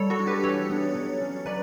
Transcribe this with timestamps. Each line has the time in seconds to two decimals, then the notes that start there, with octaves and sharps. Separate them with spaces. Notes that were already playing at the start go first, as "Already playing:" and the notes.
Already playing: G3 A4 C#5
0.10 F#4 A4
0.19 D4
0.27 G4 B4
0.44 E3 A4 C#5
0.69 B3 D4
0.95 F#3
1.21 C#4
1.46 F#3 B4 D5